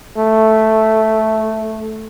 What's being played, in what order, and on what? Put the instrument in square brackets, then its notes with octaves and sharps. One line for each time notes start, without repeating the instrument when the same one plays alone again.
[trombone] A3